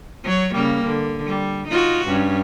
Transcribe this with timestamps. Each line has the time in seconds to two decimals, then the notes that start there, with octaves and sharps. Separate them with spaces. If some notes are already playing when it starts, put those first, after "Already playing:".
0.24 F#3 C#5
0.55 C#3 G3 A#3
0.86 D3
1.27 G3
1.68 D#4 F4 F#4
2.07 G2 C#4